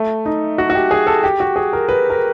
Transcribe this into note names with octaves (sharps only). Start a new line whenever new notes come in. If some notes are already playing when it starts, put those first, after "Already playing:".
Already playing: A3
D#4
F#4
F#4
G4
G#4
A4
G4
F#4
G#4
A#4
B4
A#4